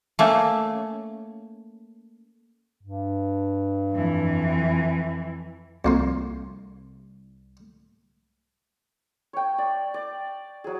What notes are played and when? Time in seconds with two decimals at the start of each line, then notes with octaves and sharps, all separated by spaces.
0.19 A3 A#3 C#4
2.83 G2
3.92 F2 E3
5.85 C2 F2 A#3 C6
9.33 C#5 G5
9.58 D5
9.94 D5
10.64 F#3 G#4